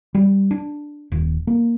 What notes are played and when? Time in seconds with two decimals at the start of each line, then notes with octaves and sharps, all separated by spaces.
0.15 G3
0.51 D4
1.12 D#1
1.47 A#3